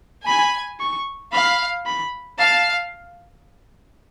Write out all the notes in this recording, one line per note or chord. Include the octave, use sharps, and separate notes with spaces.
G#5 B5
C#6
F5 B5
B5
F5 A5